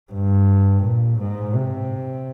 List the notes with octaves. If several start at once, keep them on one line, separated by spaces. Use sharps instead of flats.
G2
A#2
G#2
C3